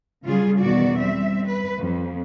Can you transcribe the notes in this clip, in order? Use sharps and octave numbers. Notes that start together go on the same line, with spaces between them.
C#3 F#3 G3 F4 G#4
E2 B2 D#3 F#4 D5
G3 C4 E5
B4
F2